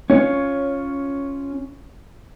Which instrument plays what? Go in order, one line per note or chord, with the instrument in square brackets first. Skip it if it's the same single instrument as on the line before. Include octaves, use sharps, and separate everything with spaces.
[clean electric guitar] C#4 F4 C#5